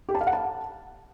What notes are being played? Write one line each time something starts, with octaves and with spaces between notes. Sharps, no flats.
G4
A5
F5
F#5
A5